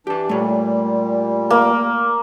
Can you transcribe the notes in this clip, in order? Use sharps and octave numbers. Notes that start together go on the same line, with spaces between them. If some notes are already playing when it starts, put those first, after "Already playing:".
E3 D4 G4 A5
A#2 G3 A3 C#5
A#3